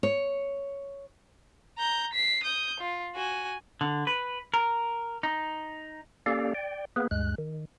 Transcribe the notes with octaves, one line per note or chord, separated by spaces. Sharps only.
C#5
A#5 G6
B6 C7
D#6 G6
F4
F#4 G#5
D3
B4
A#4
D#4
A#3 C#4 G4 A4 D5 F5
D5 G5
A#3 B3 G#4 B4
D2 G2 G#3 F#6
D#3